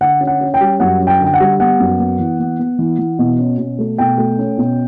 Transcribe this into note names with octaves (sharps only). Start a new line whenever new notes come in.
D3 F#5
C#4
F#5
C#4
G5
G3
F#2 F#5
C#4
G5
D3 G5
F#5
G3
B3 F#5
F#2
B3
E3
B3
B3
E3
E3
B2
C#4
B2
A3
B2 G5
A3
C#4
B2